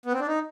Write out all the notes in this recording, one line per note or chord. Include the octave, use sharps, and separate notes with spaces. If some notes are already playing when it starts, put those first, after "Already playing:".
B3
C4
D4
D#4